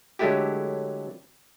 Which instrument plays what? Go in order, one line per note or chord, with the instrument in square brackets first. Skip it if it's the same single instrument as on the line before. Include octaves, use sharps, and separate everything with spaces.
[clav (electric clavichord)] D3 F#3 G#3 A3 E4 G4